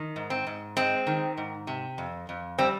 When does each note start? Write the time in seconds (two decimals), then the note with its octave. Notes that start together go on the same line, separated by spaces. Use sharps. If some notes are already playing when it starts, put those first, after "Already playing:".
Already playing: D#3
0.16 G#2
0.30 C4
0.46 G#2
0.77 G#3 C4
1.07 D#3
1.37 G#2
1.67 C3
1.98 F2
2.29 F2
2.58 G3 C4